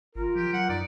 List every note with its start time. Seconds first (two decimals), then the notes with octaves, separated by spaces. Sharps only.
0.15 G#1 F4 A#4
0.35 F3 G4
0.53 F#3 F#5
0.69 F#2 D#4 D5